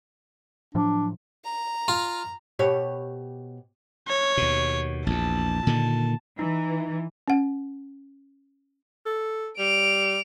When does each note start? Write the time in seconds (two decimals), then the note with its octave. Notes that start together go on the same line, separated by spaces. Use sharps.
0.75 A2 F3 F#3 D4
1.44 A#5
1.88 F4
2.59 B2 G4 C#5
4.08 C#5
4.37 D#2 B2
5.07 A#1 E2 A5
5.67 A#2 D3 D#3
6.39 E3 D#4
7.28 C#4 F#5
9.06 A4
9.58 G3 D7 F7